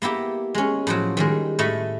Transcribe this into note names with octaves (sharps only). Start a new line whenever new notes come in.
A#3 B3 E4 G4
G#3 C#4
A2 F3 F#3
D#3 G3 G#3
A2 A3 D#5 B5